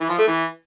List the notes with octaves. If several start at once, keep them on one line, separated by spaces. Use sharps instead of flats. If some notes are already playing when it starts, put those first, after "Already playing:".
E3
F3
A3
E3